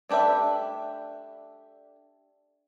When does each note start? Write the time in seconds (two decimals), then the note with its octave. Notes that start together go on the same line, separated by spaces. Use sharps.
0.09 A3 D4 G4 B4 E5